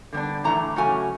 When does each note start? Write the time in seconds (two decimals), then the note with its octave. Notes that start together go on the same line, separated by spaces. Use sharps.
0.13 D3 G3 B3 D4
0.44 A2 E3 A3 D4 A#5
0.76 C#3 F#3 A3 C#4 G#5